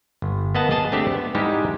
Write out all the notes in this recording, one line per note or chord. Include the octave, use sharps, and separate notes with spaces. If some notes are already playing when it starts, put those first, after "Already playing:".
G1
A#3 B3 D#5 F#5 A5
G#4 D#5 A5
A3 C4 D4 G4 A4
B3
G#2 G3 G#3 D#4 E4 G4